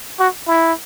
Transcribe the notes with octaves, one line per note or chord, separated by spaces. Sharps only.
F#4
E4